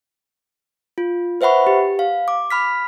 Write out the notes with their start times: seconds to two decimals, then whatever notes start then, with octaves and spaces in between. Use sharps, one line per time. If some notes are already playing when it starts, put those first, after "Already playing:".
0.98 F4
1.41 B4 C5 E5 F#5 B5 C#6
1.67 G4
1.99 F5
2.28 D6
2.50 B5 F6 B6